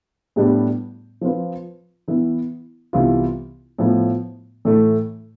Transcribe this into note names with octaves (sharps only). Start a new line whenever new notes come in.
A2 G3 B3 D4 G4
F3 C4 F4 B4
E3 B3 E4
C2 C3 E3 B3 F4
A2 F3 B3
A2 E3 A3